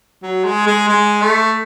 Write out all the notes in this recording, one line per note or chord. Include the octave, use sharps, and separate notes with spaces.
F#3
G#3
G#3
G#3
A3